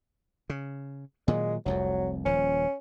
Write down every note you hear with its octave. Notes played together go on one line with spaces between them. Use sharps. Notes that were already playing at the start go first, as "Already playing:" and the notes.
C#3
A#2 D#3 F#3 G#3
F1 C2 F2 F#3
D#1 F3 C#4